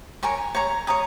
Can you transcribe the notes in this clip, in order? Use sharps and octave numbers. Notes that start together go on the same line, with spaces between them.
A#4 C#5 G#5 C#6
C#5 A#5 C#6
C#5 A#5 D#6